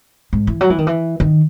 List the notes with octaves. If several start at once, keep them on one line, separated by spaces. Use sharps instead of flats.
G#2
E3
F#3
E3
D#3
E3
D#3